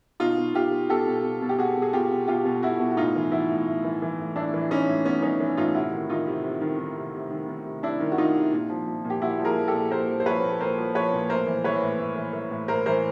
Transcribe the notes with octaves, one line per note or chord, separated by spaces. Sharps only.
B2 D#4 F4
B2
B2 F4 G4
B2
B2 G4 A4
B2
B2
B2
G4
B2 F#4 G#4
B2
G#4
B2 F4 G4
B2
B2 F4 G4
B2
B2 E4 F#4
B2
F#4
A2 D#4 F4
E3
E3 E4 F#4
A2
A2
E3
E3
A2
A2 D4 E4
E3
E3 C#4 D#4
A2
A2 B3 C#4
E3 C#4 D#4
E3
A2 D#4 F4
C3 E4 F#4
D#3
D#3 D#4 F4
C3
C3
D#3
D#3
C3
C3
D#3
D#3
C3
C3 D4 E4
D#3
F#4
D#3 D#4 F4
C3
A#2
F3
F3
A#2
G4
A#2 E4 F#4
F3
G#4 A#4
F3
G4 A4
A#2
A#2 A#4 C5
F3
C5
F3 B4 C#5
A#2
A#2 A#4 C5
F3
F3 B4 C#5
A#2
A2 A#4 C5
E3
E3 B4 C#5
A2
A2
E3
E3
A2
A2 A#4 C5
E3 A#4 C5